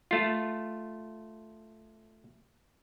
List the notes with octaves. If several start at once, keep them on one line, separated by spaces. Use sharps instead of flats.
A3 F4